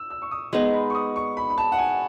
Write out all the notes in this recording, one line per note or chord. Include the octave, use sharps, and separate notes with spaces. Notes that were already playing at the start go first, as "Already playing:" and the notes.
Already playing: E6
E6
C#6
D#6
G#3 B3 D#4
B5
C#6
D#6
C#6
B5
B5
A5
F#5
G#5